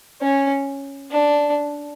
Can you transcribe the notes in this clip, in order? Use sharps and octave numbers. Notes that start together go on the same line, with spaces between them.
C#4
D4